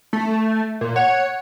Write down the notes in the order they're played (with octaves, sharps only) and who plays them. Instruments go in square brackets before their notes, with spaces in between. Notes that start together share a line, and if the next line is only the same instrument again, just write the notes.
[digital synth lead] A3
A#2
[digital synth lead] C#5 [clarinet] F#5